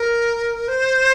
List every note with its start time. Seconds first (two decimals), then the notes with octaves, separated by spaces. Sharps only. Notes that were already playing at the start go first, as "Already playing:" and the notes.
Already playing: A#4
0.68 C5